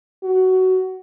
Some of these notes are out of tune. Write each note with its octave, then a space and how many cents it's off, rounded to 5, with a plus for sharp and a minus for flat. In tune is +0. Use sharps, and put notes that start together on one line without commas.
F#4 +15